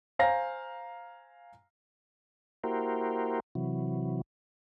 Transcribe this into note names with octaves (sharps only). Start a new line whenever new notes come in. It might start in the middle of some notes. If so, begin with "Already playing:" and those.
C5 F5 G#5 A#5 A#6
A#3 E4 F#4 G4 A#4 C5
C3 E3 F#3